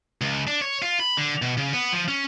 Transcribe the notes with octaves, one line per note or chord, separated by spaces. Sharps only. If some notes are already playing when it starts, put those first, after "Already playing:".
C#2
D4
C#5
F4
B5
D3
B2
C#3
B3
F3
C#4